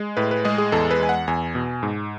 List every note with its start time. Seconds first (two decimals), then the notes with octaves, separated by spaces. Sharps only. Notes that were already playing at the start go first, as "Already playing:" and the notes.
Already playing: G#3
0.17 A2 B4
0.31 B4
0.45 G#3 G#4
0.58 G#4
0.72 E2 A4
0.91 B4
0.99 E2 G#5
1.09 F#5
1.28 E2 G#5
1.55 B2
1.83 G#2